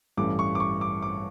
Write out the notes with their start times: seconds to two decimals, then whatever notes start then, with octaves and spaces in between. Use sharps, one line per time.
0.17 A1 G2 E3 A3 D6
0.39 C#6
0.55 D6
0.60 C#6
0.81 D6
1.02 D6